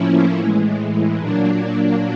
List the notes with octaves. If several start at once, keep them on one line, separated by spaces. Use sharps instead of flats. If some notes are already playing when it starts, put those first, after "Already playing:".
Already playing: A2 F3 A#3 C#4 E4
A2 E3 G#3
A#2 F#3 A#3 D4